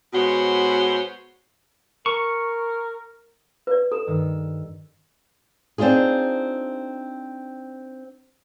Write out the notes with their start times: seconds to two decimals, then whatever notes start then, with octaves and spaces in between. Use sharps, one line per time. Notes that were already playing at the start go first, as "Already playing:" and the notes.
0.13 B2 G#3 F#4 C5 C#5 F#5
2.06 A#4 C#6
3.67 B4 D5
3.92 A4 E7
4.07 G2 D#3 E6
5.78 C4 D4 D#4 F4 G#4